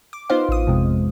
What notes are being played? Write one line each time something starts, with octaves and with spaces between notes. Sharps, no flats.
D6
B3 D#4 F4 C5 F5
A1 D#6
F2 C3 G#3